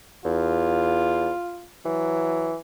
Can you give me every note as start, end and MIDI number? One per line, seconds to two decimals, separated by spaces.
0.25 1.30 40
0.25 1.67 65
1.85 2.56 52
1.85 2.52 54